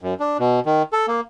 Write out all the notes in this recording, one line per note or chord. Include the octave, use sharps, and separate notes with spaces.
F#2
D4
B2
D#3
A4
A#3